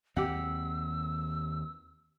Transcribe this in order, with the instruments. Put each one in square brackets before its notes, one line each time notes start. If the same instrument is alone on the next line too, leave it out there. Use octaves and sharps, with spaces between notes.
[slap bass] D#2 C4 [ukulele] G4 F#5 [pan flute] E6